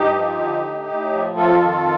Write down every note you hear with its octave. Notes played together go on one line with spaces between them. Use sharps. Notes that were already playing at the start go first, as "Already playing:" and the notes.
Already playing: G2 D#4 G4
F3
D3
A2
A2
F3
F2 F4 A4
D#3